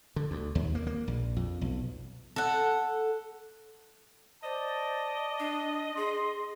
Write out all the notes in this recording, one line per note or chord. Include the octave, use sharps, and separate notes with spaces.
D3
D2
D#2
A#3
A#3
A#1
F2
B1
A4 F#5
C5 D5 D#5 A5
D4
G#4 C6